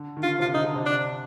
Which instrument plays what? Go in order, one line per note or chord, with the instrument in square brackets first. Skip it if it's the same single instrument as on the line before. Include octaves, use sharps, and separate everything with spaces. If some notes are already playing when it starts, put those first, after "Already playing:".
Already playing: [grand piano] D3
D#3
[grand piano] D3 [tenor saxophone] F4
[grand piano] C3 [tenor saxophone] F4
[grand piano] D3 [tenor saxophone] D#4
[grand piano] D3
C3
[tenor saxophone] D4